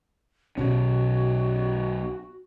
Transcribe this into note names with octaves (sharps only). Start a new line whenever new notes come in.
B1 B2 C#4 F#4